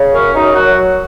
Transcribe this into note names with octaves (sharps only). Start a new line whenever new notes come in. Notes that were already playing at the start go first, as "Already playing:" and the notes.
Already playing: C#3
F#2 C#4
F#2 D#4
F#3 F#4